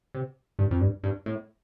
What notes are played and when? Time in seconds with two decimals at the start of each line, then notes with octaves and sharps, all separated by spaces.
0.15 C3
0.59 G2
0.71 F2
0.81 G2
1.03 G2
1.26 A2